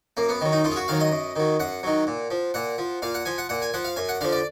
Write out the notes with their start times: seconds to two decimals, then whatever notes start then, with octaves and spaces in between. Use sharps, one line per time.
0.17 F#2 A#3
0.29 B3
0.41 D#3 F#3
0.52 D#4
0.64 F#2 F4
0.71 G#4
0.76 F#4
0.88 D#3 F#3 F5
1.00 D#5
1.12 F#2
1.36 D#3 F#3
1.60 F#2 F#5
1.83 D#3 F#3
2.07 A#2
2.31 F3
2.54 A#2 F#5
2.78 F3
3.02 A#2 F5
3.15 F#5
3.25 F3 G#5
3.38 F#5
3.49 A#2 F#5
3.62 G#5
3.74 F3 F#5
3.85 F5
3.96 F#2 G#5
4.09 F#5
4.21 D3 F3 F5
4.32 D5